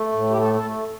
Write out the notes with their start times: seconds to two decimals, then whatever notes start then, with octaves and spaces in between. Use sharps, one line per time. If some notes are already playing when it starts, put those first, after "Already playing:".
Already playing: A3
0.13 A2
0.30 G4
0.38 A3 A4
0.55 A4
0.63 A3